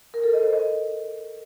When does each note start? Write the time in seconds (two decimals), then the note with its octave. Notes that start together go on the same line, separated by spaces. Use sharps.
0.14 A#4
0.24 A4
0.33 D#5
0.43 C5
0.53 D#5